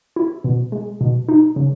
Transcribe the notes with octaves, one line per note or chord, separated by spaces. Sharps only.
E4
B2
G#3
B2
D#4
C#3